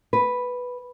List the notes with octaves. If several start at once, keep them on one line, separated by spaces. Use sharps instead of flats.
B4